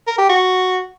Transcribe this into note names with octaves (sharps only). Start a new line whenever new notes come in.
A#4
G4
F#4